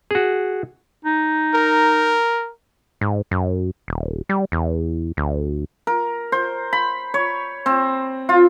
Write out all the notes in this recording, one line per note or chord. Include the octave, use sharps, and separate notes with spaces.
F#4 G#4
D#4
A#4
G#2
F#2
D#1
G3
E2
D2
A#4
C5
B5
C#5
C4
F4